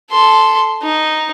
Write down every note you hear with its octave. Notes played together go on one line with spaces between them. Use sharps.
A4 C6
D#4